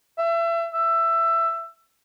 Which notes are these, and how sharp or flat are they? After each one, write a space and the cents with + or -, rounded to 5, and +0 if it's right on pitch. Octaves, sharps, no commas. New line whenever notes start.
E5 +30
E5 +15